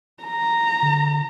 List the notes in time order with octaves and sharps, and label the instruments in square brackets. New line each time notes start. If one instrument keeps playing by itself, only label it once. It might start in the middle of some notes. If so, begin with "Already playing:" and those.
[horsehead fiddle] A#5
[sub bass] D3